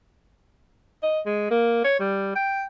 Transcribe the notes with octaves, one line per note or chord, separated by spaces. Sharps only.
D#5
G#3
A#3
C#5
G3
G5